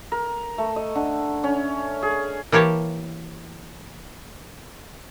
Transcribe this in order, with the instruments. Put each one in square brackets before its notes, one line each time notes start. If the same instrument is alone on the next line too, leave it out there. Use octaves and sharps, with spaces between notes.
[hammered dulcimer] A#4
A3
D#5
D3
C#4
G#4
[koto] E3 A#3 G4 C#5 A5